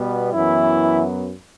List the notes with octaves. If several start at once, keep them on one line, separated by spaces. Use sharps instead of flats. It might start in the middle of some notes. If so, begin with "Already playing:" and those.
Already playing: B2 G3 B3
F#2 E3 F#3 B3 E4